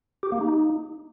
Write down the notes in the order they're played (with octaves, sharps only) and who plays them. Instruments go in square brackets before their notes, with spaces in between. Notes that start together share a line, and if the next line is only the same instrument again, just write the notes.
[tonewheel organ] G4
A#3
D#4